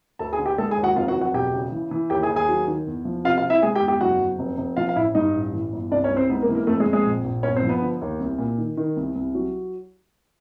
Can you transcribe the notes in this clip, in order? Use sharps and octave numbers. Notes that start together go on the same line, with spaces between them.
D2 A4 A5
G#4 G#5
D3
G4 G5
G#3 A4 A5
G#4 G#5
D#2
F#4 F#5
F1 F4 F5
F#4 F#5
F#3
F#4 F#5
E1 G4 G5
C#3
E3
E3
D#2 G4 G5
G#4 G#5
D#2
G#4 G#5
F#3
D#3
E2
F3
C3 F4 F5
F4 F5
C3
E4 E5
G#3 G#4 G#5
G4 G5
E2
G4 G5
F#1 F#4 F#5
F#1
F1
F1
F3 F4 F5
F5
A1 E4 E5
G2 D#4 D#5
A1
E3
G1
C2 D4 D5
C#4 C#5
C2
C4 C5
G#2 B3 B4
A#3 A#4
E3
A#3 A#4
F2 A3 A4
G#3 G#4
F2
G#3 G#4
A#1
A#1
G1 C#4 C#5
C4 C5
F3
B3 B4
D3
D#2
C2
A#2
D#3
D#3
C2
C2
F#3